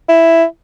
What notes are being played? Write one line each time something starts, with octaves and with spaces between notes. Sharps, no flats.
E4